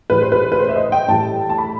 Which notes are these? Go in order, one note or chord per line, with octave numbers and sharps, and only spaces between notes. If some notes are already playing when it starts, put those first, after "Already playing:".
A2 E3 G3 B4
C5
B4
B4
C5
E5
D#5
G5
A2 E3 G3 A5
A5
B5